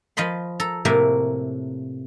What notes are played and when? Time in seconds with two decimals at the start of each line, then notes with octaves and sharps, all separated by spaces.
0.17 F3 F4 D#5 B5 C6
0.60 A4 A#5
0.85 A2 C3 A3 A#3 A#4